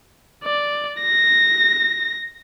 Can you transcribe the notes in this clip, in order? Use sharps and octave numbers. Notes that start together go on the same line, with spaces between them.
D5
A#6